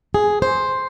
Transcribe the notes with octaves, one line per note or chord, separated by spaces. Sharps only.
G#4
C5